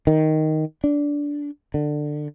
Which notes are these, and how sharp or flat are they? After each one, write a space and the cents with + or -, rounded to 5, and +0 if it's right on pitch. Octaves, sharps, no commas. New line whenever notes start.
D#3 +5
D4 -15
D3 +20